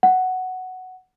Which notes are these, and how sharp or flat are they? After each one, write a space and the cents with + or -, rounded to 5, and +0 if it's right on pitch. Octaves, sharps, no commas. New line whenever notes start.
F#5 +5